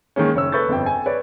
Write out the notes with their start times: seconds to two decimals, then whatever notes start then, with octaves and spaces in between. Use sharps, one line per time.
0.16 D#3 G#3 A#3 C#4
0.35 F#1 C#5 E6
0.52 A4 B4 C#6 G6 A6
0.69 G1 F2 G5
0.86 G#5
1.06 B4 C#5 D5